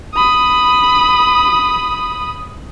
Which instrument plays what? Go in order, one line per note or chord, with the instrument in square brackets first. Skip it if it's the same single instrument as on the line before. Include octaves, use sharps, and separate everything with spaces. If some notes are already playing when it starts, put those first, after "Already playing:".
[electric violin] B5 D#6